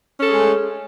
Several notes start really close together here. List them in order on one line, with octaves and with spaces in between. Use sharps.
C#4 A4 G#4 G#3 A3